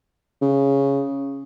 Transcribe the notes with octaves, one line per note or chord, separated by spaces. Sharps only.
C#3